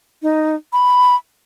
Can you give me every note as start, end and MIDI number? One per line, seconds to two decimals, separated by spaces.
0.22 0.55 63
0.73 1.16 83